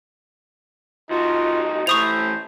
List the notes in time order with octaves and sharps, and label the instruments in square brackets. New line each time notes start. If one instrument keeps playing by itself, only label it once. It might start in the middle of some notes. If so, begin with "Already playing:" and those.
[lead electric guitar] C2 F#4 [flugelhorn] D#4 [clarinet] F4
[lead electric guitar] E3 A3 [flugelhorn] E4 [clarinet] C5 [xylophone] C#6 D#6 F7